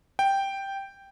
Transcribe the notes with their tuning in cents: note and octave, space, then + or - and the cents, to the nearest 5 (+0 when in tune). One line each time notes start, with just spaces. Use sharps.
G5 +0